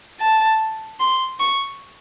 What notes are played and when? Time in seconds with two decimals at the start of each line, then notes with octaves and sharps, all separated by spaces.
0.20 A5
1.00 C6
1.39 C#6